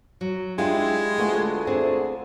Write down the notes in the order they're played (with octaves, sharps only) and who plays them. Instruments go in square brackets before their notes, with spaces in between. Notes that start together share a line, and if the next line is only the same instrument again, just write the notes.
[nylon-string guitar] F#3
[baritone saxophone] G#3 [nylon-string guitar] D4 F4 [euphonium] E4 [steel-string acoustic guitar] G4
[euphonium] D2 [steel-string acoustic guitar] A3 B3 F4 [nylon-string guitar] G#4
[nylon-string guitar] C4 D4 G#4